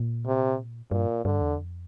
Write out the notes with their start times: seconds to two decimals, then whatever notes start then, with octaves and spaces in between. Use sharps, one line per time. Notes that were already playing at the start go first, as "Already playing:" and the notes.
Already playing: A#2
0.26 C3
0.91 G2 A#2
1.25 G2 D3
1.41 E2
1.58 F2